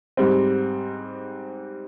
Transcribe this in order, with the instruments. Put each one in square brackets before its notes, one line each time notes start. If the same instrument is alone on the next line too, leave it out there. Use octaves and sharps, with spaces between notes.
[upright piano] G#2 G3 C4